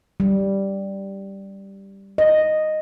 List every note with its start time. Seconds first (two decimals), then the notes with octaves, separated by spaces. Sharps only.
0.20 G3
2.18 D#5